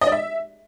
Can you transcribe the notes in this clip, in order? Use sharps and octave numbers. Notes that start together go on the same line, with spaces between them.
D#5
D5
E5